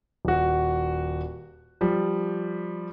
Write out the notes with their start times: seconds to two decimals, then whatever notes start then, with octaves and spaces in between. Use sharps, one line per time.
0.25 D#1 F#4
1.81 F3 G3